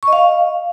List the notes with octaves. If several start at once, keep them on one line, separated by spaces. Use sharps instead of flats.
C#6
D#5
F5